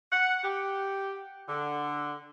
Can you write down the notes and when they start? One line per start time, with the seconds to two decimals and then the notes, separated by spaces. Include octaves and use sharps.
0.12 F#5
0.43 G4
1.47 D3